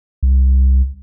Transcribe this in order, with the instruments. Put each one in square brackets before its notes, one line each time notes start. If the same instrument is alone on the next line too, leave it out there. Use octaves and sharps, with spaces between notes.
[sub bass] C2